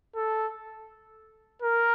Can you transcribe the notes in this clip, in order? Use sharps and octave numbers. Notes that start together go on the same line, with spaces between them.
A4
A#4